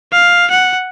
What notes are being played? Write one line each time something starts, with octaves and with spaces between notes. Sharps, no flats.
F5
F#5